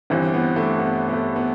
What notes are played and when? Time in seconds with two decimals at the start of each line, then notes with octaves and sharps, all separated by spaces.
0.10 G1 G2 E3 C4
0.34 B3
0.56 A3
0.79 B3
1.08 B3
1.13 A3
1.36 B3